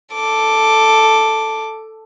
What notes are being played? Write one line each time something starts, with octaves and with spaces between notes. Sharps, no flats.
A4 D6